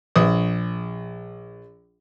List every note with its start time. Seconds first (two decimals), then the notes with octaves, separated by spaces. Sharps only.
0.16 A#1 D#6